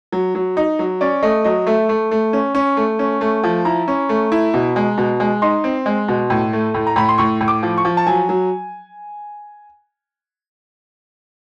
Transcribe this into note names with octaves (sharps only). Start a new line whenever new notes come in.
F#3
F#3
D#4
F#3
C#4 D5
A3 D#5
F#3 D#5
A3 E5
A3
A3
C#4
C#4
A3
C#4
A3
F3
E4 A#5
C#4
A3
E4
B2
G#3
B2
G#3
D#4 C6
C4
G#3
B2
A2
A3
A2
A#5
A2 B5
C6
A2 C#6
A2
D6
F3
C#6
F3
A5
F#3 G#5
F#3